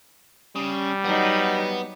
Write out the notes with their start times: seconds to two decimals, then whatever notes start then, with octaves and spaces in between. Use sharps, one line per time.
0.56 C#3 G3
1.04 F#3 B3 D#4